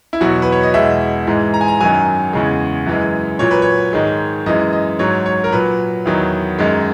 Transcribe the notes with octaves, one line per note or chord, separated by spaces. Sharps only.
E4
E2 B2 F#3 F#4
B4
C#5
D#5
E2 B2 G#3 E5
G#2 E3 G#3
A#5
G#5
A#5
F#2 D#3 F#3 G#5
E2 C#3 G#3
F#2 E3 G#3
A#2 F#3 C#5
B4
C#5
G#2 D#3 G#3
F#2 E3 G#3 D#5
D#5
G#2 F#3 C#5
C#5
A#4
A#2 F#3 B4
E2 D#3 F#3
F#2 D#3 G#3